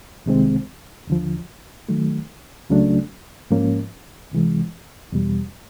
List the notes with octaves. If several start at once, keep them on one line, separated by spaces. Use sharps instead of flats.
C2 C3 D#3 G#3 C4
D#2 D3 F3
D#3 F#3 A3
C#2 C#3 F#3 A3 D4
G#2 F3 A#3 C#4
C#2 C3 E3 G#3
E2 B2 G3